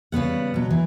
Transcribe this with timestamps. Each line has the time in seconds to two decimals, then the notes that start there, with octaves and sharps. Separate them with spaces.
0.12 C#3 G3 B3 F#5
0.54 B2 F#3
0.71 E3